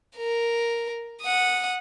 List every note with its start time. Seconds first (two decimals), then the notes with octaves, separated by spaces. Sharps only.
0.17 A#4
1.21 F#5 D#6